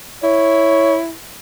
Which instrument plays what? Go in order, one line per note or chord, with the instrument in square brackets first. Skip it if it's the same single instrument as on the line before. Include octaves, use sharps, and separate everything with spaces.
[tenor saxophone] E4 [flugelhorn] C#5